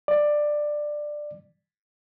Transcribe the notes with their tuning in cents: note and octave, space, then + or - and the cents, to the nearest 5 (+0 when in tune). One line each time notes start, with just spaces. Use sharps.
D5 +15